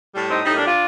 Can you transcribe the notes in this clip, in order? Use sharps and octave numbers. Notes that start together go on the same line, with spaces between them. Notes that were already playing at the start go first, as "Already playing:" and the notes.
A2 G3
C4 D#4
A2 G3 C4 D#4
A#3 D4
D4 F4